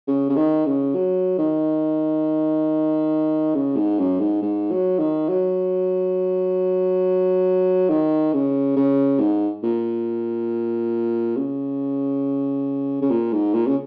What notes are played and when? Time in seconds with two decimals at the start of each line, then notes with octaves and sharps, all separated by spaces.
0.08 C#3
0.29 C#3
0.36 D#3
0.66 C#3
0.95 F#3
1.38 D#3
3.55 C#3
3.77 G#2
3.98 F#2
4.20 G#2
4.42 G#2
4.71 F#3
4.99 D#3
5.29 F#3
7.89 D#3
8.33 C#3
8.76 C#3
9.20 G#2
9.63 A#2
11.37 C#3
13.01 C#3
13.10 A#2
13.33 G#2
13.54 A#2
13.67 C#3